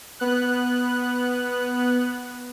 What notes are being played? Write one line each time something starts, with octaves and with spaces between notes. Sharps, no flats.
B3 F#6